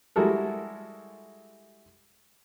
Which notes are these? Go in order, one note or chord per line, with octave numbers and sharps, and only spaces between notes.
G3 G#3 E4 F#4 A4 A#4